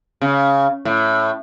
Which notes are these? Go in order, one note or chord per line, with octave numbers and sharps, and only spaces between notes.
C#3
A2